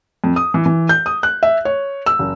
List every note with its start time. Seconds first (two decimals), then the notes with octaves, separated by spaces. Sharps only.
0.24 F2
0.36 D#6
0.54 E3
0.66 E3
0.89 G6
1.06 D#6
1.23 F#6
1.43 E5
1.65 C#5
2.06 E6
2.19 F#1